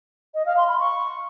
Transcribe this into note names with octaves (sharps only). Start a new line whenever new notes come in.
D#5
F5
C6
B5
C#6